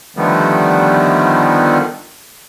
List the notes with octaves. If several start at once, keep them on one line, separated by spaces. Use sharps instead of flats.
D3 D#3 F3 G3 A3 B3